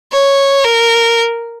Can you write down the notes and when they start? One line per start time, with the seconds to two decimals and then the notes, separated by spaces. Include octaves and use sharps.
0.13 C#5
0.65 A#4